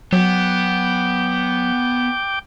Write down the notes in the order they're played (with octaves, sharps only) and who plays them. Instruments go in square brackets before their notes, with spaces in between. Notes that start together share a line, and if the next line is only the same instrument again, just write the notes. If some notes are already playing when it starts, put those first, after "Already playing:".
[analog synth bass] F#3 [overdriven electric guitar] B3 [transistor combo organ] G5 D6